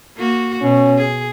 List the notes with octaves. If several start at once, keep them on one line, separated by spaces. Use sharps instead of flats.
A#3 F#4
B2 C#4
G#4